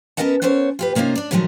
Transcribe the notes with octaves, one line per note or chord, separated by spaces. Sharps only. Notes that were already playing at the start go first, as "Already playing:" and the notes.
B3 C#4 A#4 D#5 F#5 A5
B3 C#4 A#4 C5 C#5
F4 G4 B4
C3 A#3 C#4 D#4 F4
D4 D5
A2 D#3 F3 F#3 G#3 A3